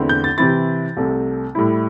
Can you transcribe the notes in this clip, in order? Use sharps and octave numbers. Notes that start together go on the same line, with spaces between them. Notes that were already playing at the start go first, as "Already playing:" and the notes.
Already playing: E2 D3 A3 C4 E4
G6
A6
C3 E3 C4 E4 A6
C2 C3 A3
A2 G3 E4